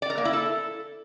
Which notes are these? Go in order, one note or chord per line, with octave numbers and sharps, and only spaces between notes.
D5
A#4
A#3
E4
A4